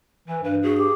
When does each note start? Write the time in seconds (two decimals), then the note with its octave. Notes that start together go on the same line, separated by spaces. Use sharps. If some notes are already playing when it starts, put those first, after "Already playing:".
0.28 E3 B4
0.44 G2 B4
0.63 F#4 G#4
0.77 G4